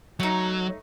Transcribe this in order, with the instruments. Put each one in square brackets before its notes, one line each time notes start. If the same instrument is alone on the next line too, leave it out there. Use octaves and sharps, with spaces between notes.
[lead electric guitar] F#3 [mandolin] A3 D#4